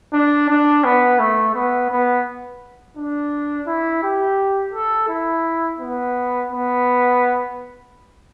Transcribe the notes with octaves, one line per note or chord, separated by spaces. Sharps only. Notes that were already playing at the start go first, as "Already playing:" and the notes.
D4
D4
B3
A3
B3
B3
D4
E4
G4
A4
E4
B3
B3